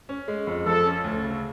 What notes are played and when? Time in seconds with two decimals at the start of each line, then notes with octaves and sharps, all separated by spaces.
0.09 C#4
0.28 G#3
0.47 F2
0.66 F3 A4
0.85 C#4
1.04 D2
1.23 C#3